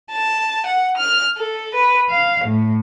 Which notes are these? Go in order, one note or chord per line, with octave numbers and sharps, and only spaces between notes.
A5
F#5
F6
A4
B4
F5
A2